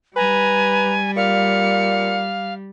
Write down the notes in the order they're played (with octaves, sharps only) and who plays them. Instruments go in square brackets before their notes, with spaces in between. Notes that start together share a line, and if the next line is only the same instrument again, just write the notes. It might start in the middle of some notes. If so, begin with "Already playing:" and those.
[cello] G3 [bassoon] B4 [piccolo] G#5 [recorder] A#5
[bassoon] A#2 [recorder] F5 [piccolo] C#7